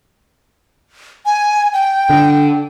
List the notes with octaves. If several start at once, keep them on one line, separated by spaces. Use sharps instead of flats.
G#5
G5
D3